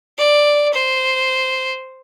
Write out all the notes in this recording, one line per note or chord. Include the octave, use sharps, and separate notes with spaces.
D5
C5